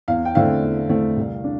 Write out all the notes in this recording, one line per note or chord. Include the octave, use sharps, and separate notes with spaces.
E2 F5
G5
D3 A3 C4 E4 F5
E2
D3 A3 C4 E4
C2
D4